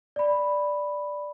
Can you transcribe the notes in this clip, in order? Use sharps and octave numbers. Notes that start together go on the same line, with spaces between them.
D5 B5